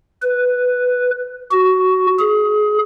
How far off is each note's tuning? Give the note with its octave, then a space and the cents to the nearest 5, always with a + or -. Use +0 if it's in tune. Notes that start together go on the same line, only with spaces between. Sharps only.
B4 +5
F#4 +15
G#4 +25